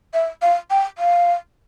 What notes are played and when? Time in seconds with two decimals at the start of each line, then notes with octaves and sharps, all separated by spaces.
0.14 E5
0.42 F5
0.70 G5
0.98 F5